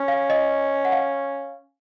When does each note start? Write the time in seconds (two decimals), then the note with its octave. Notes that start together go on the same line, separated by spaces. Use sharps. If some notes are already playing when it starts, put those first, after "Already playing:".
Already playing: C#4
0.08 F5
0.30 D#5
0.85 F#5
0.92 F5